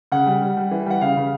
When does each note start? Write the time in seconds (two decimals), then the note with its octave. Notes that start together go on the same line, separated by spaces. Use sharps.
0.12 C#3 F#5
0.26 G3
0.42 G3
0.57 G3
0.71 E3
0.86 G3 F#5
1.01 C#3 F5
1.16 C#3